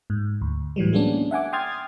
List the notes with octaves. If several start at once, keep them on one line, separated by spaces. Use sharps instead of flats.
G#2
D2
A2 E3 F#3 G3
G#3 A#3 B3 C#4 D4
E5 F#5 G#5 D6
G5 C6 D#6 F6 G#6 A6